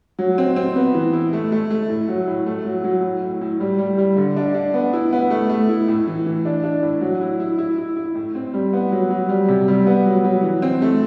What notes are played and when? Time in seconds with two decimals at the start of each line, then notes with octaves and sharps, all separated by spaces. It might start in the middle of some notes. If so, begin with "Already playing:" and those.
0.19 F#3
0.38 C4
0.56 C4
0.76 B3
0.94 E3
1.13 E4
1.33 A3
1.52 A3
1.70 A3
1.89 A2
2.08 F#3
2.28 A2
2.46 A3
2.65 F#3
2.84 F#3
3.03 A2
3.23 A2
3.41 A2
3.60 G3
3.78 G3
3.98 G3
4.17 D3
4.36 D4
4.54 D4
4.74 B3
4.93 E4
5.13 B3
5.30 A3
5.49 A3
5.69 E4
5.88 A2
6.07 E3
6.26 E3
6.45 D4
6.64 D4
6.82 A2
7.01 F#3
7.21 E4
7.40 E4
7.58 E4
7.78 E4
7.96 E4
8.15 A2
8.35 C4
8.53 G3
8.73 B3
8.92 F#3
9.10 F#3
9.29 G3
9.48 C3
9.68 G3
9.87 B3
10.06 F#3
10.24 F#3
10.43 E3
10.62 C4
10.82 A3